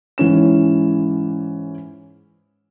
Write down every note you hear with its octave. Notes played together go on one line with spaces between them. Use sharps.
G#2 E3 C#4 E7